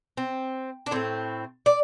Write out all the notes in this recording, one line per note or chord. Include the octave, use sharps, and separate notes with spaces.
C4
D4
A2 A3 C4
D5